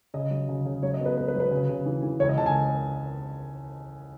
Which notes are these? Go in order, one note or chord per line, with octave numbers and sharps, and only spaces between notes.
C#3 D#5
F#3
C#3
C#3
F#3 C#5
D#5
B3
B4
B3 B4
B4
F#3
B4
C#3
C#3
E3
E3
C#2 C#5
D#5
C#2 A5
G#5